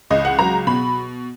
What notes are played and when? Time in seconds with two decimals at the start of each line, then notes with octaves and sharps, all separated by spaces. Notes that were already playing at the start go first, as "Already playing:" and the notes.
0.10 C#2 D#5
0.25 F#5
0.39 F#3 A#5
0.67 B2 B5